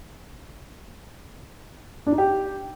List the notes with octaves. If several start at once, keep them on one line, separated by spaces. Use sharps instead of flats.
D4
D#4
G4